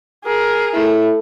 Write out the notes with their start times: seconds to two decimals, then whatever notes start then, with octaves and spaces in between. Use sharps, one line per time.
0.25 G#4 A#4
0.74 A3 E4